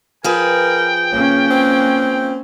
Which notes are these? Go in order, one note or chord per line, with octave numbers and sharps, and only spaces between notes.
F3 G#4 A#4 B4 G5
C#3 A#3 C#4
C4